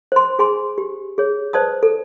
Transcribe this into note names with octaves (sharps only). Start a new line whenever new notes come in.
C5 C6
G#4 G#5 C6
G4
G#4 C#5
B4 C5 D5 A5 D#6
A4